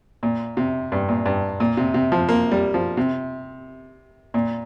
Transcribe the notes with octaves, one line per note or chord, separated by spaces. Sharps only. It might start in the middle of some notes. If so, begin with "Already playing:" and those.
A#2
C3
G2
A#2
G2
A#2
C3
C3
F3
A#3
G3
F3
C3
A#2